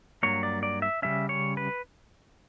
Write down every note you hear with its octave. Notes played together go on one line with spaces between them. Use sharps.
G2 F#3 A#3 C#5
D5
D5
E5
C#3 E3 G3 C#4 E5
C#5
B4